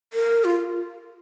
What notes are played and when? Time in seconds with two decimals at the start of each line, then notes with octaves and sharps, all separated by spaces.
0.13 A#4
0.44 F4